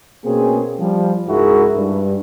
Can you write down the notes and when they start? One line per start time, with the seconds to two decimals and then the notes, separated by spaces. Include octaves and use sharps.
0.24 B2 A#3 C4 C#4 G#4
0.80 F3 G3
1.28 C#2 G#2 E4 F#4 G#4 A#4
1.76 G2